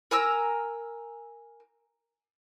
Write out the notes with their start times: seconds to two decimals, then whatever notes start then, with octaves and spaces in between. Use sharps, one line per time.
0.11 A#4 G#5 A#5 E6